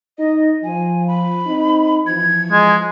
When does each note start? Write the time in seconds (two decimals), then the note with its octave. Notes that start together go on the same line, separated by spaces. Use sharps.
0.18 D#4 D#5
0.64 F3 G#5
1.08 B5
1.46 C4 D#4
2.07 E3 F3 G#6
2.52 G#3